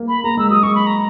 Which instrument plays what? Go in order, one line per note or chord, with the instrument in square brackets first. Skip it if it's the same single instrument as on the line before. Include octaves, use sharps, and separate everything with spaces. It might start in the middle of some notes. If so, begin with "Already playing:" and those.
Already playing: [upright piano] A#3
[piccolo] B5
[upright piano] A#3 [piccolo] A#5
[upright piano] G#3 [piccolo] E6
[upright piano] F#3 [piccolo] D#6
[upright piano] G#3 [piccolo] C#6
[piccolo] B5
A#5